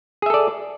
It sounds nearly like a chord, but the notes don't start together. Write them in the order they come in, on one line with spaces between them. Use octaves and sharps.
G#4 E5 A4 D5